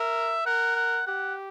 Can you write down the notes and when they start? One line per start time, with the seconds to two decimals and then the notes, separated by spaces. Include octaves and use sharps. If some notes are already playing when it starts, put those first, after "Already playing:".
Already playing: A#4 E5
0.46 A#4 F#5
0.76 F#5
1.07 G4 F#5